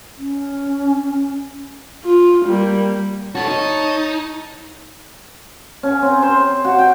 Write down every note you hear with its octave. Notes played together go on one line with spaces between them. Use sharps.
C#4
F4
G3 A#3
F#4 A4 C#5 A5
D#4
C#4
C4
C5
F#4
G5